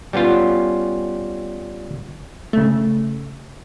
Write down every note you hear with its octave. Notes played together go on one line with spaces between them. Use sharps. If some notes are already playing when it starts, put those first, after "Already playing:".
G3 B3 C#4 F4
C#3 A3